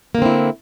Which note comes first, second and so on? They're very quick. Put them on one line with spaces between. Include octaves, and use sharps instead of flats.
A#3 D3 C4 E4